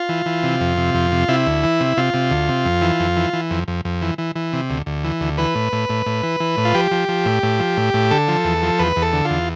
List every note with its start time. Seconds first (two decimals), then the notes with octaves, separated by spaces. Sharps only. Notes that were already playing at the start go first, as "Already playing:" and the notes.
Already playing: F4
0.09 E3
0.26 E3
0.43 C3
0.61 F2
0.77 C3
0.94 F2
1.12 C3
1.28 C3 E4
1.46 D2
1.63 E3
1.80 C3
1.97 C3 F4
2.14 C3
2.31 D2
2.49 C3
2.65 F2
2.82 E3
3.00 F2
3.17 E3
3.33 E3
3.51 F2
3.68 F2
3.85 F2
4.02 E3
4.18 E3
4.36 E3
4.53 C3
4.70 D2
4.86 D2
5.04 E3
5.21 D2
5.38 E3 B4
5.55 A2
5.72 A2
5.89 A2
6.06 A2
6.23 E3
6.40 E3
6.57 A2
6.65 F4
6.74 F3 G4
6.91 F3
7.09 F3
7.26 A2
7.43 A2
7.59 F3
7.77 A2
7.94 A2
8.11 D3 A4
8.28 F3
8.45 E2
8.63 F3
8.79 E2 B4
8.96 E2
9.02 A4
9.13 D3
9.25 F4
9.30 E2